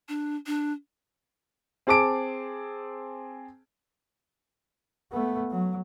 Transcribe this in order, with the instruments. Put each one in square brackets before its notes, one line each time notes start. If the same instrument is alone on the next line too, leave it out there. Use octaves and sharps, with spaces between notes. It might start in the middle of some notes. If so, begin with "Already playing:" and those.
[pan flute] D4
D4
[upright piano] C4 G#4 A5 D6 D7
[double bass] A3 B3
F#3